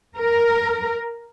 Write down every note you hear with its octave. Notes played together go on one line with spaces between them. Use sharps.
A#4